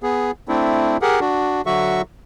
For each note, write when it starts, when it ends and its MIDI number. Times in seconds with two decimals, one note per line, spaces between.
0.03 0.31 59
0.03 0.31 68
0.48 0.97 57
0.48 0.97 60
0.48 0.97 62
0.48 0.97 64
1.02 1.20 67
1.02 1.20 68
1.02 1.20 70
1.02 1.20 78
1.21 1.61 62
1.21 1.61 66
1.66 2.02 50
1.66 2.02 54
1.66 2.02 66
1.66 2.02 76
1.66 2.02 85